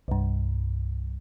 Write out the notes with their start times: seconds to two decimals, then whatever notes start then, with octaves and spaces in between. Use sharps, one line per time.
0.08 C2 G2